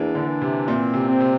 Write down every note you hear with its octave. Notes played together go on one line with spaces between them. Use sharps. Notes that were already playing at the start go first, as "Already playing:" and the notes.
Already playing: E2 E3 A#3 D4
D3
E3
C3
A#2 C4
C3
C4
C3